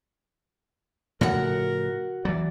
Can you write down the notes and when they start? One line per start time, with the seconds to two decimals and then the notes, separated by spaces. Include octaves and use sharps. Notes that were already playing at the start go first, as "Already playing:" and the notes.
1.21 A2 C#3 F3 F#4 A#4 F#5
2.25 E3 F#3 D5